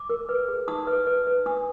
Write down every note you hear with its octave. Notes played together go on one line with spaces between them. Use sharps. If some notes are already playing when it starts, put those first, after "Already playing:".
Already playing: D6
A#4
B4
G#4
D#4 D#6
B4
B4
B4
D4 D#6